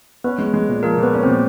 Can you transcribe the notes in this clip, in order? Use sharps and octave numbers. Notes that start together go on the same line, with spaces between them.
B3 C#4 B4
G#3
G#3
A#2
F3 A#3 A#4
A#2
B3 B4
C#4
A#2 C4 C5